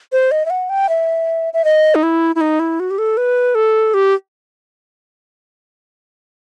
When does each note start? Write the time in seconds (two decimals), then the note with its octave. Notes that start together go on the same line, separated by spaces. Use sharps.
0.12 C5
0.31 D#5
0.46 E5
0.50 F#5
0.70 G5
0.89 E5
1.53 E5
1.64 D#5
1.95 D#4
2.03 E4
2.36 E4
2.41 D#4
2.60 E4
2.80 F#4
2.91 G4
2.98 A4
3.17 B4
3.55 A4
3.94 G4